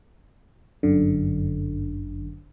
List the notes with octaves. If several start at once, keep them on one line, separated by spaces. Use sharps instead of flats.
G1 F#2 D3